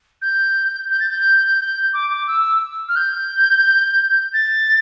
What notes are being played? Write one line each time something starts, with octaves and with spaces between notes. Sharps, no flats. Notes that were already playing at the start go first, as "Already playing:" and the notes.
G6
G6
A6
G6
G6
D6
D6
E6
F6
G6
A6